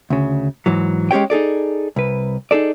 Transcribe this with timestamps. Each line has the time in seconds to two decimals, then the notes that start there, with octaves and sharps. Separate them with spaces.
0.10 D2 C#3
0.66 G#2 E3 F#3
1.11 G#3 C#4 G4 C#5 G5
1.30 D#4 G#4 A4 D5
1.96 C2 B4
2.51 D#4 G#4 A4 D5